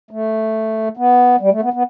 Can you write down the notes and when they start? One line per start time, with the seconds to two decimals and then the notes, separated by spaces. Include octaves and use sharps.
0.11 A3
0.97 B3
1.40 G3
1.51 A3
1.62 B3
1.73 B3